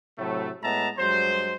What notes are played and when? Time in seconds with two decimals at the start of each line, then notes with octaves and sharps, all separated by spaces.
0.18 A2 C3 F#3 A3
0.63 A2 G#3 B3 E5 A5 A#5
0.99 G2 F#3 G#3 C5